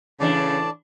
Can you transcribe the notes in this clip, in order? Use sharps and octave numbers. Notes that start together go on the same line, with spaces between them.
A2 C#3 E3 D4 D5 A5